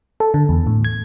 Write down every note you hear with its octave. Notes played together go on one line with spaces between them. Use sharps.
A4
D3
E2
A2
G#6